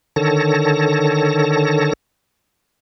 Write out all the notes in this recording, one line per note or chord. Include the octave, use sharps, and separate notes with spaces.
D3 D#3 A4 C#5 A5 A#6